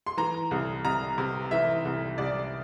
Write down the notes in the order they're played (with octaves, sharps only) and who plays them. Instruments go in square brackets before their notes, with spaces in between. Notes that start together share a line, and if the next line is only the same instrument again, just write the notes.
[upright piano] C6
E3 A#5
C2
C2 A#5
C3
E3 E5
C2
C2 D5